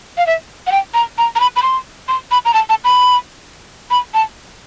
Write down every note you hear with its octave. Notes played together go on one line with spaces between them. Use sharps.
F5
E5
F#5
G5
A#5
A#5
A#5
B5
B5
C6
C6
B5
A#5
A5
A5
B5
B5
A5